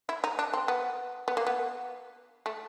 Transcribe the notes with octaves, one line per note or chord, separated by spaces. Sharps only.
E4
D#4
D4
C4
B3
B3
A#3
B3
A3